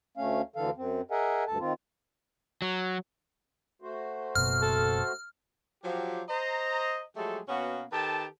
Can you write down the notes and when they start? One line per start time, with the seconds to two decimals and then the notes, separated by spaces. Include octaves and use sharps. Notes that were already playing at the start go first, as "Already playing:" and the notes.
0.17 D2 A3 C#4 F5
0.56 D2 D3 E3 A4 F5
0.77 F#2 C4
1.11 G#4 A#4 D#5 E5 F#5 G#5
1.47 D2 G2 A4 A5
1.60 D#3 C4 F4
2.62 F#3
3.82 A3 F#4 C5
4.35 F#1 B2 F6
4.62 A4
5.84 F3 F#3 G4
6.29 C5 D#5 A#5
7.16 F3 F#3 G#3 A3 G4 A4
7.48 B2 A#3 B3 C#4 F#4
7.92 D#3 G4 A4 B4 A5